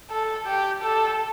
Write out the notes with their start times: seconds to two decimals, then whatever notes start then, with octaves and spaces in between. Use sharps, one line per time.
0.11 A4
0.46 G4
0.82 A4